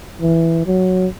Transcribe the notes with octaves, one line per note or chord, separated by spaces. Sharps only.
E3
F#3